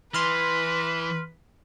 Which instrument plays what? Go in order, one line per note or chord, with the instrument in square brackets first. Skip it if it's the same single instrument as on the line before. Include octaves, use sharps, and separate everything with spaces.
[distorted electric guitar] E3 [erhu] B4 [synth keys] C6 F6